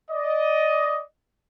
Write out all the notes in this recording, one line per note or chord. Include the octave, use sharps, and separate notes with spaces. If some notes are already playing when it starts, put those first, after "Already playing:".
D5 D#5